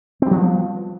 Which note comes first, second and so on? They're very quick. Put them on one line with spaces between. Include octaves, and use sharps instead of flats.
C4 G3 F3 B3